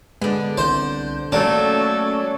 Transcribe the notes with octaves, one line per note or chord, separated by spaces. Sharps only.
D3 G#3 B3
C2 C5 G6
F#3 A3 A#3 C#4 D4 A4 C#5